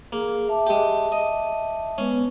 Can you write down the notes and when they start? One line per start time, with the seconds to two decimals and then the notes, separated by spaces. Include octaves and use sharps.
0.13 A#3 G#4
0.48 E5 A5 D6
0.67 G#3 G4
1.12 D#5
1.98 G#3 B3 C#4 B4